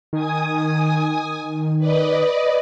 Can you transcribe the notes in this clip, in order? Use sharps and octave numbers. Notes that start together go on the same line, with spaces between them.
D#3 G#5 D#6
B4 D5 D#5